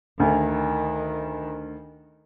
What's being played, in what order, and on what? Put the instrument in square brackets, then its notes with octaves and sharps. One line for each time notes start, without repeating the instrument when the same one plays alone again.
[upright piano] D2 [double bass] D#3